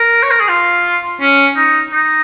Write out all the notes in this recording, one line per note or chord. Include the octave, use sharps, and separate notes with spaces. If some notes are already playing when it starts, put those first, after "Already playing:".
Already playing: A#4
C#5
A#4
G#4
F4
C#4
D#4
D#4